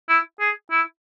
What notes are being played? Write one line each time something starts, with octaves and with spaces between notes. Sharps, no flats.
E4
G#4
E4